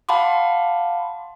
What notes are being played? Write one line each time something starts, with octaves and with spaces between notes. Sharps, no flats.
F5 F#5 A5 B5 C6 D6